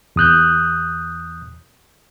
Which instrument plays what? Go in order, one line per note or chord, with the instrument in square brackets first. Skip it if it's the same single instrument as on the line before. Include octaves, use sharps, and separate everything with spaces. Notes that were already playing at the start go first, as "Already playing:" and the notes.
[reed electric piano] E2 D#6 F#6 G6